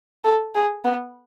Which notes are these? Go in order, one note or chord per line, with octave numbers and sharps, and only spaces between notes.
A4
G#4
B3